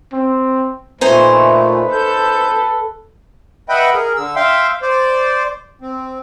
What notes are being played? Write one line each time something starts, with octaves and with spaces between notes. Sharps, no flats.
C4
A#2 A3 D#4 B4 C5 G#5
A4 G6
B4 D#5 E5 F#5 G5 B5
G#4 A#4
D3 E6
E5 F5 G5 C6
C5 D5
C4